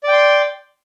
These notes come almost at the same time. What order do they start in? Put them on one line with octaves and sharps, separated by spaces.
D5 G5 C6